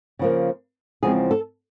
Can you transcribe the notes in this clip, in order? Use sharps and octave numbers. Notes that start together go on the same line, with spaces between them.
C#3 F3 A#3
E2 C#3 F3 G#3 C4 G#4
A4